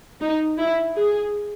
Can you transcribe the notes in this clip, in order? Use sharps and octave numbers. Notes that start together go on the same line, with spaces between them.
D#4
E4
G#4